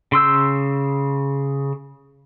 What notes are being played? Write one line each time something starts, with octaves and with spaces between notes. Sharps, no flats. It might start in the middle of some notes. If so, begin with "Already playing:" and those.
C#3 C6 E6 G6